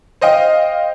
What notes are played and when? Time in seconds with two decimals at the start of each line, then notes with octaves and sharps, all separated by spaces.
0.21 C5 D#5 F5 G5